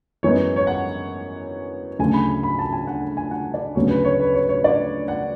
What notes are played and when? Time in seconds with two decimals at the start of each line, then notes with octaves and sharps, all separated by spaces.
0.23 F#2 E3 G#3 B3 C#5
0.56 C#5
0.67 F#5
1.99 D2 C#3 F#3 A3 G#5
2.14 B5
2.43 B5
2.59 A5
2.72 G#5
2.87 F#5
3.17 G#5
3.31 F#5
3.54 D5
3.75 D2 C#3 F#3 B3 C#5
3.90 B4
4.04 C#5
4.20 B4
4.34 C#5
4.49 C#5
4.64 D5
5.08 F#5